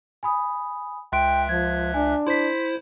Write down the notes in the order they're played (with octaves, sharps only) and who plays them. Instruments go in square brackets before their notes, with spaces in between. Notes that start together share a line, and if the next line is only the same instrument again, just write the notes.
[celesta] G#5 B5 D#6
[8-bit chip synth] C#2 E5 F#6 [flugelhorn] G5 [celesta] C6 D7
[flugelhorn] F3 [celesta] G#6
[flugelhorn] D4 [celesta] G#5
[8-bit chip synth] E4 C5 [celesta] C6 B6